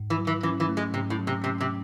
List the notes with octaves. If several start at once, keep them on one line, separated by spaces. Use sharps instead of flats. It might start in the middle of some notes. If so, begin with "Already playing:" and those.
Already playing: G#2
E3
F#3
E3
E3 C#4
E3
A3
G#3
G#2 C3
A2
F#3
C3
C3 C#4
C3